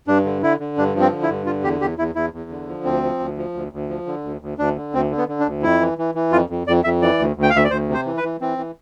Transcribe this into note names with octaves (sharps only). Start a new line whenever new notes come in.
G2 D4
D3
D3 E4
D3
G2 D4
F3
C4
D3
E4
G2
D3 F4
E2 G4
E2 G4
E2 E4
E2 E4
E2
D3
F3
D2 C4
F3
D2
F3
D2
D2
F3
D3
D2
D2
D2 D4
D3
D2 C4
D3
B3
D3
D4
D2
F2 E4
E3
E3
E3
F2 F4
F2
F2 D5
F2 E5
E3 D5
D2
D2
G5
F5
D2 E5
D5
D2 C5
C3
C5
E3
B4
E3
E3 C4
E3